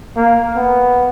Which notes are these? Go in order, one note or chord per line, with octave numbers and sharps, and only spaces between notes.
A#3
B3